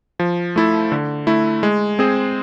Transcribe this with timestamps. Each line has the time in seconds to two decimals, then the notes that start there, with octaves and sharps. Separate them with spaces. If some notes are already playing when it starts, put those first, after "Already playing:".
0.19 F3
0.56 A3 E4 A4
0.92 D3
1.27 A3 E4
1.63 G#3
1.99 C4 G#4 C5